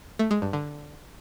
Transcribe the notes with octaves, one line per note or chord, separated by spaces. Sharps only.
A3
G#3
G2
D3